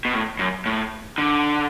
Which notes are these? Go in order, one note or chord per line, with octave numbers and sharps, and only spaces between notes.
B2
A2
F#2
A2
D3